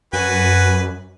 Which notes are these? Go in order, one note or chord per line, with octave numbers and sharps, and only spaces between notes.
F#2 F#4 B4 G#5